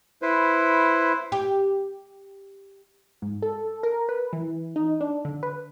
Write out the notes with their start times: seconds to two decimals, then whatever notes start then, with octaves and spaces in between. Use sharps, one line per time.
0.22 E4 B4 C5
1.32 G4
3.22 G#2
3.42 A4
3.83 A#4
4.09 B4
4.33 E3
4.76 D#4
5.01 D4
5.25 D3
5.43 B4